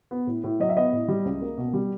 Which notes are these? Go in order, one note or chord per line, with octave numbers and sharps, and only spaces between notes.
B3
A2
A2
F#3 D#5
E5
B3 D#5
A2
G3
C#2
A#3
B2
G3